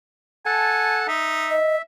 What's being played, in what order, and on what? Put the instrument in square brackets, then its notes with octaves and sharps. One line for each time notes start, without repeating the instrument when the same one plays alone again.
[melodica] A4 F#5 A5 [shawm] G#5
[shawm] D#4 [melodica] E5
[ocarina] D#5